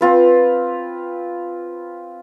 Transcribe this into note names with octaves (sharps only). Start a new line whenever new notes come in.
C4 F4 B4